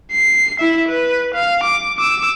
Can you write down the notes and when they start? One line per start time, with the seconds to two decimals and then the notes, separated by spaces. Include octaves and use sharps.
0.12 C7
0.60 E4 E5
0.88 B4
1.34 F5
1.63 D6
1.97 D6 E6